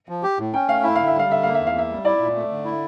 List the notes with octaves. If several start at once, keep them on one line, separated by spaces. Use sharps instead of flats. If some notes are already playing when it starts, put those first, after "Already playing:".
F3
G4
A2
C#4 G5
A3 F5
E4 E5
D3 F5
E5
G3 F5
D3 E5
A#3 F5
E2 E5
F5
A#3 E5
G3
E4 D5
A#2
A3
D3
E4